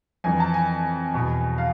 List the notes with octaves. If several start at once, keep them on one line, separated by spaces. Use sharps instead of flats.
F2 E3 G#5
A5
G#5
E2 B2
F5